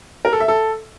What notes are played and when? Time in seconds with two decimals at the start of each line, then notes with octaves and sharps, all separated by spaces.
0.25 A#4
0.33 A4
0.40 E5
0.48 A4